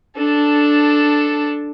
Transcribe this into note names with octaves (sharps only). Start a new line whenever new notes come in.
D4 A4